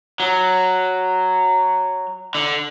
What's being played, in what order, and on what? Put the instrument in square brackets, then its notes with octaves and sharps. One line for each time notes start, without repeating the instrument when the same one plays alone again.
[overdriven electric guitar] F#3
D3